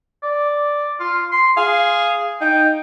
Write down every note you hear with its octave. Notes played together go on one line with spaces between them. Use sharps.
D5
F4
C6
G#4 F5
D#4 G5